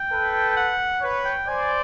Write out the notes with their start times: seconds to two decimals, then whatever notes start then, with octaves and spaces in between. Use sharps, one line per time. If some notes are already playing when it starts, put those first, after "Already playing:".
Already playing: G5
0.12 A4 B4
0.57 F#5
1.02 B4 C#5
1.25 G5
1.47 C5 D5 G#5